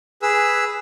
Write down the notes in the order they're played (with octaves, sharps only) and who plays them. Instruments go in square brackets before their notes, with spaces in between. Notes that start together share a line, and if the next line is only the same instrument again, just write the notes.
[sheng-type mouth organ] G#4 B4 E6